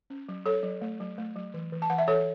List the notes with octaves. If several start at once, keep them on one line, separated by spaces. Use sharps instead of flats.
C#4
F#3
F#3 A4 C#5
F#3
A3
F#3
A3
F#3
E3
E3
A5
E3 F#5
E5
E3 A4 C#5